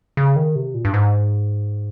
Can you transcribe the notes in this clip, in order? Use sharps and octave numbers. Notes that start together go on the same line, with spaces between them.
C#3
D#3
C3
A#2
G2
G#2